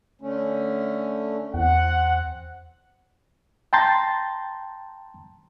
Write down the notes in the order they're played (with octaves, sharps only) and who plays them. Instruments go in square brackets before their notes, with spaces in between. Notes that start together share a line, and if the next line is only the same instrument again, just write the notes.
[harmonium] D3 A3 C#4
[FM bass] E2 [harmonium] C4 [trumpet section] F#5
[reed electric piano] G5 A5 A#5 C6 G6 A6